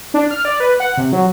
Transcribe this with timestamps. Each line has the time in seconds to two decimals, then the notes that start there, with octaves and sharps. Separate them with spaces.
0.14 D4
0.31 F6
0.45 D5
0.60 B4
0.80 F#5
0.97 C3
1.13 F#3